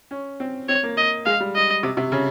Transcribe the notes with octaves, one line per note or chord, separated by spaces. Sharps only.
C#4
C4
C4 C#5
A#3
D#5
G#3 F5
G3
D#5
C3
C3
C#3